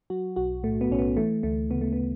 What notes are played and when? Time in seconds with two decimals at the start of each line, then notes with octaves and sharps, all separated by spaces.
0.10 F#3 F#4
0.36 B1 F#4
0.63 A2 A3
0.81 B3
0.90 B1 C#4
0.99 B3
1.17 E3 A3
1.43 D2 A3
1.70 C#3 B3
1.81 A3
1.93 B3